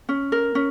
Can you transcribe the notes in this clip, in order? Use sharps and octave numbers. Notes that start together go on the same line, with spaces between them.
C#4
A#4
C#4